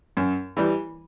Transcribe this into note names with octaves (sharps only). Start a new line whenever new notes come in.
F#2
E3 G3